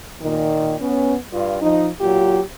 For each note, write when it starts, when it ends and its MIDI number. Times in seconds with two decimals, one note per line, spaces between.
0.22 0.75 46
0.22 0.75 51
0.80 1.14 59
0.80 1.14 61
1.31 1.59 43
1.31 1.59 65
1.61 1.87 53
1.61 1.87 63
2.01 2.40 46
2.01 2.40 54
2.01 2.40 65
2.01 2.40 67